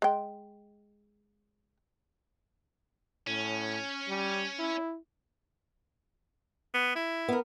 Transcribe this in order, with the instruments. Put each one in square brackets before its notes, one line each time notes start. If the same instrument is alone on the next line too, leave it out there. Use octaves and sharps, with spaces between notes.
[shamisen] G#3 G5
[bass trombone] A2 [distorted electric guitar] C#4
[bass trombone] G3
E4
[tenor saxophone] B3
E4
[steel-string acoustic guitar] B3 A#4